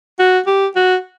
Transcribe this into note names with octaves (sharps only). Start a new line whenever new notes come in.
F#4
G4
F#4